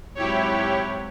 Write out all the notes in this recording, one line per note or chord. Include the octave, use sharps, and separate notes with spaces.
G#2 C3 F#3 E4 G4 C#5